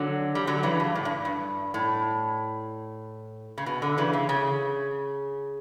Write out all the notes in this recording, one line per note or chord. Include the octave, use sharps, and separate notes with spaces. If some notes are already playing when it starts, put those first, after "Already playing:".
Already playing: D3 F#3
G3
D3 F#3
C#3 E3
G2
A2
G2
G2
A2
C#3
B2
D3
C#3 E3
C#3
C#3